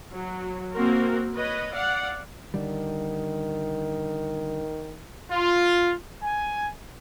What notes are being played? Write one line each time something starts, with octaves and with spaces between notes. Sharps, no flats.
F#3
A#3 C4 F#4 A#4
B4 C#5 D#5
D5 F5 F#5
D3 D#3 G3
F4
G#5